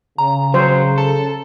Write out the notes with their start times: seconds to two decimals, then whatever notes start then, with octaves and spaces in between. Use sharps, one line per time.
0.18 C#3 A#5
0.54 F#3 C5
0.98 A4